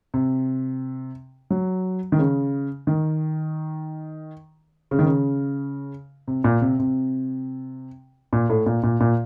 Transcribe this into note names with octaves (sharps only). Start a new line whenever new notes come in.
C3
F#3
D#3
C#3
D#3
C#3
D#3
C#3
C3
A#2
C3
C3
A#2
A2
A#2
A#2
A#2